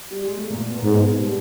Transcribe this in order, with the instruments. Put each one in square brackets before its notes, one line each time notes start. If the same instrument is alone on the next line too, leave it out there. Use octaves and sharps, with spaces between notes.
[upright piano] G3
G#3
A3
A#2 A#3
B2 B3
A#3
[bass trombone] G#2 [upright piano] B2 B3
[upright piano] G#2 G#3
G3